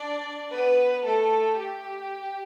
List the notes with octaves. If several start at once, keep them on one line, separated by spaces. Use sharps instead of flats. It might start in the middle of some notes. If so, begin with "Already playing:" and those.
Already playing: D4 D5
B3 B4
A3 A4
G4